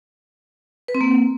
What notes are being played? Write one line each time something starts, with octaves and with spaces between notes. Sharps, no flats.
B4
C4
A#3